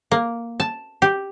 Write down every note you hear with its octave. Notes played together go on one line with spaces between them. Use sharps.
A#3
A5
G4